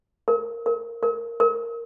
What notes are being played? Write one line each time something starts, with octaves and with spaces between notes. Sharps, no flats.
A#4
A#4
A#4
A#4